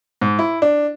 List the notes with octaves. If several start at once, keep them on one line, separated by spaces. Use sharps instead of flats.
G#2
E4
D4